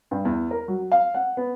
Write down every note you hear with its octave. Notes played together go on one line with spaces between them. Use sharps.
G2
E2
A#4
F#3
F5
F#5
B3